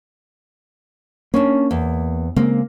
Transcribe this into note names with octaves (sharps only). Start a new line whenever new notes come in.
A#3 C#4 D4
E2
C#3 G#3 A#3 C4